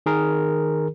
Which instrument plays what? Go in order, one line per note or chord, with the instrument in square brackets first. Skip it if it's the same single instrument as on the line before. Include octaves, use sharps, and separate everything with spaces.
[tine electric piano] D#3 G#4 A#4